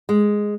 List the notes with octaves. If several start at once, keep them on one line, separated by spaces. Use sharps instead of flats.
G#3